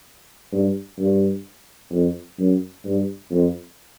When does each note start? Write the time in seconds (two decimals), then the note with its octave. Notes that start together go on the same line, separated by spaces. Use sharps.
0.52 G2
0.98 G2
1.91 F2
2.39 F#2
2.85 G2
3.31 F2